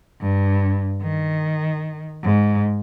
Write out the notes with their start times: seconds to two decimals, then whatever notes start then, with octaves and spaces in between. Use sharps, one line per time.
0.21 G2
1.02 D#3
2.23 G#2